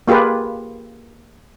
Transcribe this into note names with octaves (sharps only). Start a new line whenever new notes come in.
A#3 F4 G4 G#4 B4